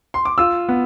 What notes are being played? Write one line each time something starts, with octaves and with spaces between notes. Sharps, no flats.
C6
D6
F4 E6
B3